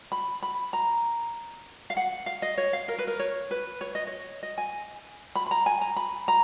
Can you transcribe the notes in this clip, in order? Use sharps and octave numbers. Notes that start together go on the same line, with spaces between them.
B5
B5
A#5
F5
F#5
F5
D#5
C#5
F5
A#4
B4
A#4
C#5
B4
C#5
D#5
C#5
D#5
G#5
B5
B5
A#5
G#5
A#5
B5
A#5